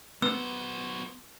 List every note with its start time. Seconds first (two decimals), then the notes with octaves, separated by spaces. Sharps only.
0.22 F#3 B3 C5 E6